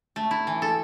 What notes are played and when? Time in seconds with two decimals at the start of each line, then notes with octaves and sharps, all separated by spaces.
0.16 A3
0.31 E4
0.47 E3
0.62 A4